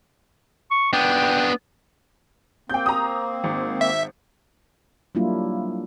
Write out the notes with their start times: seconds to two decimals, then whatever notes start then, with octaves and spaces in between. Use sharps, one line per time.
0.71 C#6
0.93 B3 D4 G5
2.70 A#3 C4 G5 G6
2.86 A#5 D#6
3.44 G#1
3.81 E5
5.15 F#3 G3 A#3 D4 E4 F4